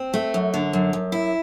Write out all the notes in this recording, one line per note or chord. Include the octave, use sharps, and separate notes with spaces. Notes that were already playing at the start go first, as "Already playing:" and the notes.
Already playing: C4
A3
F#2
D3
F#2
F#2
E4